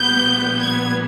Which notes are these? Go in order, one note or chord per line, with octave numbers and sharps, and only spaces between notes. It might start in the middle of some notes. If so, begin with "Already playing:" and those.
Already playing: A#1 A#2 G3 B3 G6
G#6